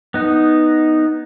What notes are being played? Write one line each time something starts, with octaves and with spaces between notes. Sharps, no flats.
B3 D#4